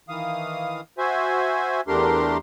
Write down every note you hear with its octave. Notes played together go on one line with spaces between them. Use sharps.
D#3 E3 F5 D#6
F#4 C5 E5 G#5
E2 A3 D4 G4 A#4 C6